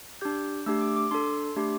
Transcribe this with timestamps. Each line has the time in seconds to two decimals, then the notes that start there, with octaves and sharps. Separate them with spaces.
0.21 D4 G4 G6
0.66 A3 D4 G4 E6
0.81 D6
0.96 D6
1.11 D4 A4 C6
1.56 A3 D4 G4